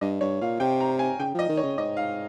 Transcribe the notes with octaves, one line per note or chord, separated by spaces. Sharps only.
G2 D#5
G2 C#5
A#2 F5
C3 G5
A#5
G#5
C#3 G5
F3 D#5
D#3
C#5
C#3
G#2 D#5
F5